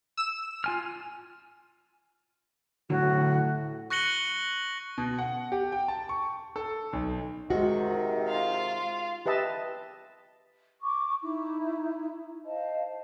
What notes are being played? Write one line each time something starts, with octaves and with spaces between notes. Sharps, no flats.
E6 E7
F4 G#5 F6
D2 A2 D3 F#3 F#4
C#6 F#6 A#6 C#7 F#7 G7
B2
F#5
G4
G5
A5
C#6
A4
B1
C3 D#3 G#3 F#4
F4 F5
G4 B4 D#5 E5 A5
C#6 D6
D#4 E4
C5 D#5 F5 A5